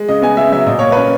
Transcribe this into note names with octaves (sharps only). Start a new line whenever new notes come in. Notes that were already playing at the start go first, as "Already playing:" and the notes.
Already playing: G#3
C#3 D#5
B3 G#5
C#3 E5
F#3 E5
A#2 D#5
A#3 C#5
C#4 B4